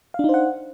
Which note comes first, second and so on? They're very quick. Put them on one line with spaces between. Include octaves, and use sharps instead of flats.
F5 D4 D#4 C5 F#5